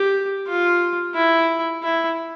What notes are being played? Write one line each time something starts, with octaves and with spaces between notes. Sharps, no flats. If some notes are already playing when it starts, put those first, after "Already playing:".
Already playing: G4
F4
E4
E4